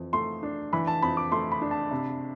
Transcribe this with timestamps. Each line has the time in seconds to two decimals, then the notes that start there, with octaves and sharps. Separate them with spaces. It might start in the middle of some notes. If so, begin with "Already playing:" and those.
Already playing: F2 E3
0.13 A3 C6
0.43 D4
0.73 E3 B5
0.87 A5
1.02 F2 B5
1.17 D6
1.32 A3 C6
1.52 B5
1.62 D4
1.71 A5
1.91 C3